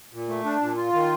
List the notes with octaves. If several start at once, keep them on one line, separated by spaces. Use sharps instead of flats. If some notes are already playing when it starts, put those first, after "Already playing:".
A#2
A3
D4
A#2
F4
D#3